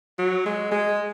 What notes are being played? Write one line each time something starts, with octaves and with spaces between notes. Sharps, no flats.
F#3
G#3
G#3